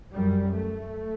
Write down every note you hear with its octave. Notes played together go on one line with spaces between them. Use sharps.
F#2 G3
A3